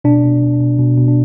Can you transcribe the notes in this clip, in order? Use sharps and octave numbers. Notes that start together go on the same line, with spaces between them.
B2 D4
B2
B2
B2
B2
B2
D4